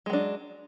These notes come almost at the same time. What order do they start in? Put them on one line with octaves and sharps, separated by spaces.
G#3 F#3 D4